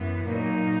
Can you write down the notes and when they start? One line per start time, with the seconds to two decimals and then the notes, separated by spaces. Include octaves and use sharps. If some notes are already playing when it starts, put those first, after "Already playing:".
Already playing: F#2 E3 B3
0.29 A#2 F#3 A#3 D#4